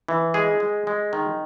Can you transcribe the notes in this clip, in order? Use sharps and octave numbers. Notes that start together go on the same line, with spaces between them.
E3
G#3 G#4
G#3
G#3
D#3